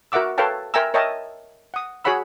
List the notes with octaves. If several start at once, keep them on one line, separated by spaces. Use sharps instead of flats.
F#4 A#4 E5 F#5 D6 E6
A4 B4 C#5 F5 G5 A5
A#4 E5 G5 G#5 A#5 E6
A#4 C#5 D#5 E5 G5 A5
F#5 D#6
F#4 G#4 C#5 F#5 B5 E6